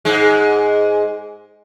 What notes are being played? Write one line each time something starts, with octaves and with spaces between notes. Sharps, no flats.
G#2 G#3